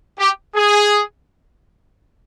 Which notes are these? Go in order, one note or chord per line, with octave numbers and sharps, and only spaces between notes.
G4
G#4